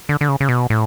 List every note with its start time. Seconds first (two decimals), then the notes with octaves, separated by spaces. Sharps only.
0.09 D3
0.21 D3
0.29 C#3
0.40 C#3
0.49 B2
0.70 A2